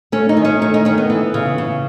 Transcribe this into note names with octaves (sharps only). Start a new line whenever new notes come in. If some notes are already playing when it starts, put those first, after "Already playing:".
A3 C#4
D#4
D#3
C#4
A3 C#4
D#4
D#3 C#4
B3
E3
C#3
C#3